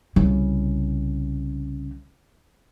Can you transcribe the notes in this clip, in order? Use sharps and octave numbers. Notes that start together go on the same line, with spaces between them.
C2 C#3